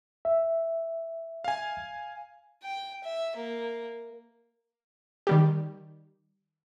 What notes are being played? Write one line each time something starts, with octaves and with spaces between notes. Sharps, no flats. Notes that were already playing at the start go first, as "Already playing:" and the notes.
E5
F5 G#5
G5
E5
A#3
D#3 G3 G4